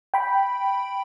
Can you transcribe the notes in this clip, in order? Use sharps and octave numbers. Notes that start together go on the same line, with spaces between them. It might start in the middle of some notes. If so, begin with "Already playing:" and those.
G5 B5